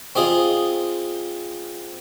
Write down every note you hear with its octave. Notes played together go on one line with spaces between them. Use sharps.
C4 F4 G#4 D#5